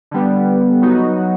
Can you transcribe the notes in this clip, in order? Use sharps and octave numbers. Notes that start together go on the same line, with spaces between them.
D3 G3 B3
F#3 B3 D#4 F#4